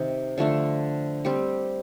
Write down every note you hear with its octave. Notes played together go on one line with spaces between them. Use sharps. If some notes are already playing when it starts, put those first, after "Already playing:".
Already playing: C3 D#3 D#4
D3 F3 A3 D4
G3 C4 G4